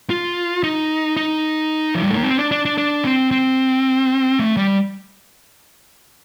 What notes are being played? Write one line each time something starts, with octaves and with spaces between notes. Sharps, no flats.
F4
D#4
D#4
F3
G3
A3
A#3
C4
D4
D4
D4
D4
C4
C4
A3
G3